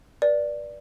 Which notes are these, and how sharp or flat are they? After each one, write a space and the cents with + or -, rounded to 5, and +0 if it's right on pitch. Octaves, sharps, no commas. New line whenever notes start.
B4 -35 D5 +0